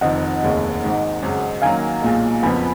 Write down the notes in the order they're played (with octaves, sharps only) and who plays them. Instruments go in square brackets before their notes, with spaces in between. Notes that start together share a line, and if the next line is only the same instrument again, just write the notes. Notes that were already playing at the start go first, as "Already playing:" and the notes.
[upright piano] F1 F2 D#3 [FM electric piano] D#5 F#5
[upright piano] F1 D#2 C#3 G#3
G#1 G#2 D#3 G#3
G#1 F#2 C#3
[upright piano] F#2 D#3 F#3 A#3 [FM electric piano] F5 G#5
[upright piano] B1 A#2 G#3
[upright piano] F#1 F2 F3 B3 [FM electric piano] G#5 B5